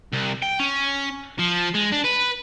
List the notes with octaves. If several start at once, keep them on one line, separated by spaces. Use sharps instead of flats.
C2
G5
C#4
F3
G#3
D4
B4